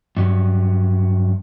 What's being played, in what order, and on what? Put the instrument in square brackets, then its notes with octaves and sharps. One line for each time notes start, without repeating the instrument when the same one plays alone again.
[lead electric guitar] G2 F#3